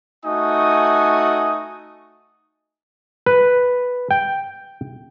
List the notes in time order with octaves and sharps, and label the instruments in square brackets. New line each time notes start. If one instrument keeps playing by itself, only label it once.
[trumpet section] A3 D#4 F#4 G#5 D#6
[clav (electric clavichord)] B4
G5